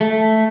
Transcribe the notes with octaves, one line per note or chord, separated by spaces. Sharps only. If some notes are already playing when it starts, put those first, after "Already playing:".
A3